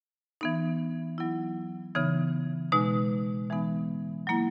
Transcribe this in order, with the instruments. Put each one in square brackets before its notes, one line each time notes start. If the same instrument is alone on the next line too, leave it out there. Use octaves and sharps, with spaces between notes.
[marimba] E3 B3 D#4
F#3 B3 E4
C#3 E3 B3 D#4
B2 G#3 D#4
E3 G#3 B3 D#4
F#3 A#3 E4